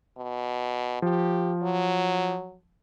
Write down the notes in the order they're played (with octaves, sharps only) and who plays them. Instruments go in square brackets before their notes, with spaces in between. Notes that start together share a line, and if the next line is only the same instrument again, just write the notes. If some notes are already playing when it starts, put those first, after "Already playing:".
[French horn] B2
[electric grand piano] F3 [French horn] G4
[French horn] F#3